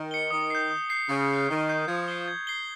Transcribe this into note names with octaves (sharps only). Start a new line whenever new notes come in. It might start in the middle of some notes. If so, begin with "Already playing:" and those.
Already playing: D#3
C#7 G7
D#3 D#6
G6 C7
D#6
G6 C7
C#3 C#6
G6 C7
D#3 C#6
G6 C7
F3 G#6
C7 G7
G#6
C7 G7